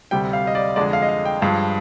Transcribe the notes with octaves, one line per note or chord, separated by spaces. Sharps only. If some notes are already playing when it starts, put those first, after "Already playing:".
D2 C3 G3 G5
F5
D#5
D5
F2 D3 G#3 D5
F5
D#5
F5
G5
G2 F3 G#3 F5